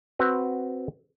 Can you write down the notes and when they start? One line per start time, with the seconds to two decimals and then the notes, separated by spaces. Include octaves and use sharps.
0.19 C4 F#4 B4